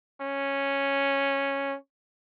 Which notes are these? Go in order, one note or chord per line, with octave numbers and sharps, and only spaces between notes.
C#4